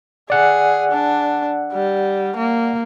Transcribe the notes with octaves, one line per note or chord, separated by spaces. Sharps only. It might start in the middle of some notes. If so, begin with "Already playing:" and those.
G#4 D5 F#5
D4
G3
A#3